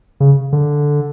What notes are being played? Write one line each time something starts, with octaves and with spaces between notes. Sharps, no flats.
C#3
D3